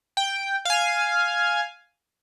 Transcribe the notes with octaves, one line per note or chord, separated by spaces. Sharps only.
G5
F5 G#5